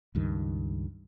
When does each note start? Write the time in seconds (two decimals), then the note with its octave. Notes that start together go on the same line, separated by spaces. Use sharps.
0.15 C#2 G2 D#3